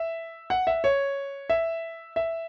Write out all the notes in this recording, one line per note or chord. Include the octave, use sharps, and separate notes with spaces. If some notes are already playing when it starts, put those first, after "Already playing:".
Already playing: E5
F#5
E5
C#5
E5
E5